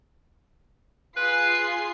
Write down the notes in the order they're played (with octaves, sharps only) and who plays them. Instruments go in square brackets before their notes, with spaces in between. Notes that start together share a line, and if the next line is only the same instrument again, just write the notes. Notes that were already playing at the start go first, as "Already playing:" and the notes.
[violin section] F4 G#4 C7 [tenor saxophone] B4